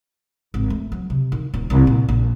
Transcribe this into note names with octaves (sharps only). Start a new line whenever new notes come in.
G#1
A3
F#3
C3
D#3
D#1
C2
A#2
A#1